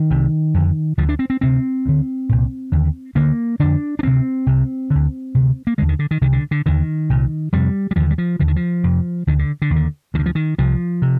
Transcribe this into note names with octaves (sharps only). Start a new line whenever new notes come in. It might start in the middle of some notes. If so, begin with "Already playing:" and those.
Already playing: D#3
C2 C3
F2 D3
D2 D3 F3
D4
C4
C4
D2 C3 C4
D2 D3
C2 A#2
D#2 D3
D2 D3 A#3
F2 D3 D4
D4
D2 C3 C4
C2 C3
D2 D3
D2 C3
A#3
D#2 D3 G#3
D#3
D3
D#3
C2 C3 D#3
D3
D3
D#2 D3 D#3
C2 A#2
F2 C3 G3
G3
D#2 D3 F3
G3
F3
D#2 D3 F3
D#3
F3
F2 C3
D2 D3 D#3
D3
D3
D#2
D3
D2 D#3
D3
F3
D#3
C2 C3 F3
C3